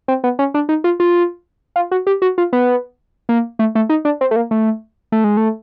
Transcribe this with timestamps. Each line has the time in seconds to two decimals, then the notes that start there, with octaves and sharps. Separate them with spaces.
0.08 C4
0.24 B3
0.39 C#4
0.54 D4
0.69 D#4
0.84 F4
1.00 F4
1.76 F4
1.91 F#4
2.07 G4
2.22 F#4
2.38 F4
2.53 B3
3.29 A#3
3.59 A3
3.75 A3
3.89 D#4
4.05 D4
4.21 C4
4.31 A3
4.36 A#3
4.51 A3
5.12 A3
5.24 G#3
5.37 A3